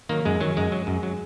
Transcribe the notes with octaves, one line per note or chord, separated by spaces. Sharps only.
D#3 F#3 A#3
F#2 G#3
D#3 F#3
F#2 G#3
F#3
F#2
F#3